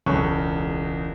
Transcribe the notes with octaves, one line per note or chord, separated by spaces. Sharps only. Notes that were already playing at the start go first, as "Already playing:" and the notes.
E1 C#2 C#4 A4 C#6 F#6